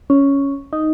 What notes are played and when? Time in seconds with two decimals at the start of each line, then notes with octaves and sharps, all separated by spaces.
0.10 C#4
0.73 D#4